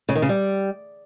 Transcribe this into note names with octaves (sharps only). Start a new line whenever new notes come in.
C#3
D#3
C#3
G3